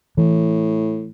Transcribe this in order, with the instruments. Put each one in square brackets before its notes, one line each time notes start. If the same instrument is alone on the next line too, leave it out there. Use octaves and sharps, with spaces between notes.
[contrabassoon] A2 [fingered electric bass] E3